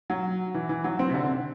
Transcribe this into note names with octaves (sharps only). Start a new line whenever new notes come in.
F#3
E3
E3
F#3
C4
C3
D3